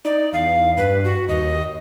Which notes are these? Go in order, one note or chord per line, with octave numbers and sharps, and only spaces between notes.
D#4 D5
E2 F5
G2 B4
F#4
D#2 D#5